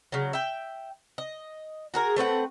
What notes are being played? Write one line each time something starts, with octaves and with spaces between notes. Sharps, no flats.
C#3 F#3
E5 G5
D#5
F#4 G#4 A#4
A3 C4 B4 F#5